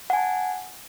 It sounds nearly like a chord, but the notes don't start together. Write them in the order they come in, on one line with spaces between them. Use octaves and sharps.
F#5 G#5 A5